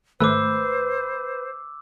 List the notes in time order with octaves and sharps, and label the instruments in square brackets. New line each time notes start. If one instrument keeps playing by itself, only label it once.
[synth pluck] G#1 A3 [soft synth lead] B4 [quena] C5 [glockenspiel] D6 E6